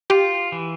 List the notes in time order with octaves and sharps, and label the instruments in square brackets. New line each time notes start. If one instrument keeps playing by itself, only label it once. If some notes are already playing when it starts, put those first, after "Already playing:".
[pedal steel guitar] F4 [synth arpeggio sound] G4
[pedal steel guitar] E3